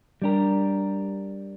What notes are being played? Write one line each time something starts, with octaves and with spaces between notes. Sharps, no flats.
G3 D4 G4 A#4